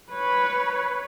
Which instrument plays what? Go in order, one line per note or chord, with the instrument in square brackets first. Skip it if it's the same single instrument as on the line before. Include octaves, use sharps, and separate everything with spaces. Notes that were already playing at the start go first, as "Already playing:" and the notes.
[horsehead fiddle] B4 C#5